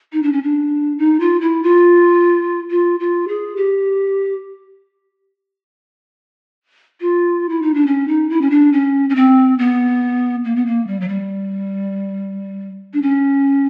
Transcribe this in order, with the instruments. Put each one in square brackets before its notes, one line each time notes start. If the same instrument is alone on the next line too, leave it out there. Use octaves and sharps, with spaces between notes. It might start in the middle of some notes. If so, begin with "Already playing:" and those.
[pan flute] D#4
D4
C#4
D4
D#4
F4
E4
F4
F4
F4
G#4
G4
F4
E4
D#4
D4
C#4
D#4
E4
C#4
D4
C#4
C#4
C4
B3
A#3
B3
A#3
G3
F#3
G3
D4
C#4